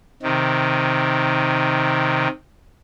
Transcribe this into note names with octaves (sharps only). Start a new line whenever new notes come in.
C3 D#3